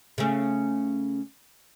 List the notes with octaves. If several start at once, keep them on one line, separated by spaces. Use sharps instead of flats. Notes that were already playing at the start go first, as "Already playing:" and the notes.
C#3 A3